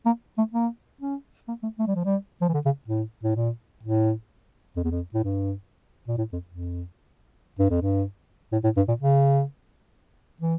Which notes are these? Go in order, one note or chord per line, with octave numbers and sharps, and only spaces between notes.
A#3
A3
A#3
C#4
A#3
A3
A3
G3
F3
G3
F3
E3
D3
C#3
A2
A2
A#2
A2
F2
E2
F2
A2
G2
A#2
A2
F2
F2
G2
F2
G2
A2
A2
G2
A#2
C#3
E3